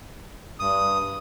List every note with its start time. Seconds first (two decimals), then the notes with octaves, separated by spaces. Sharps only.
0.60 G2 D#6